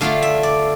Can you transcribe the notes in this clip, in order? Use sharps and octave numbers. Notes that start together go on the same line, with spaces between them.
D3 A3 D4 F4 F5
E5
D5